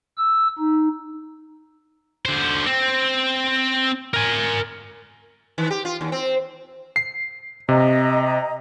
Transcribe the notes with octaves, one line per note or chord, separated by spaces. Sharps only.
E6
D#4
D3 C5
C4
A#4 G#5
D#3
G4
F4
D#2
C4
C7
C3 D#5 A#5